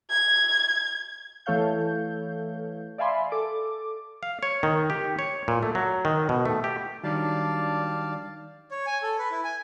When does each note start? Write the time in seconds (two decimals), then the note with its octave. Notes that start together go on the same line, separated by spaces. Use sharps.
0.10 G#6
1.46 E3 A3 A4 C#5 F5 G6
2.98 D5 E5 F5 G#5 B5 C6
3.32 A4 D6
4.23 F5
4.43 C#5
4.63 D#3
4.90 G4
5.19 C#5
5.48 A#2
5.63 A3
5.75 F#3
6.05 D#3
6.29 B2
6.45 A3
6.64 G4
7.03 D#3 F#3 G3 D4 D5 F5 A5
8.71 C#5
8.87 G#5
9.02 A4
9.19 B4
9.31 E4
9.44 G#5